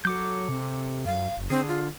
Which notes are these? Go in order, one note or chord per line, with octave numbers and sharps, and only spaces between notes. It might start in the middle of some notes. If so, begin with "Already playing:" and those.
F#3 A4 D6 G6
C3
F#2 F5
F#1
D3 C4 G#4
F4